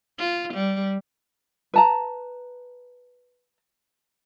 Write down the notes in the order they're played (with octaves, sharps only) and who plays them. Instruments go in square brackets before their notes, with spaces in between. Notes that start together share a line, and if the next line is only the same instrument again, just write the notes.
[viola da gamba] F4
G3
[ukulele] B4 A5 A#5